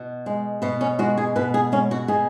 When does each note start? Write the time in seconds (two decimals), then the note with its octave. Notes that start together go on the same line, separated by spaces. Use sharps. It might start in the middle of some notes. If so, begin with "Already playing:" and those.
Already playing: B2
0.26 G#3
0.62 B2 B3
0.81 C#4
0.99 G#3 F#4
1.17 G#4
1.36 B2 B4
1.54 G#4
1.72 G#3 C#4
1.91 F#4
2.08 B2 G#4